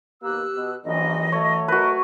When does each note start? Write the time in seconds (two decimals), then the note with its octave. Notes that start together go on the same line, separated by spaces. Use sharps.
0.23 D#2 B2 A#3 G4 E6 F#6
0.55 B2
0.85 A#1 F#2 E3 D#5
1.32 F#3 A3 C#5
1.68 F#4 A#4 B4 D#5